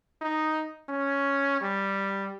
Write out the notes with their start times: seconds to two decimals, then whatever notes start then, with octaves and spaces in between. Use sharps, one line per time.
0.21 D#4
0.89 C#4
1.61 G3